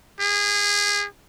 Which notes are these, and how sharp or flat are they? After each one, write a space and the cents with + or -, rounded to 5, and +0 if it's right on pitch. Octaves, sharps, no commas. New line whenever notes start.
G#4 -25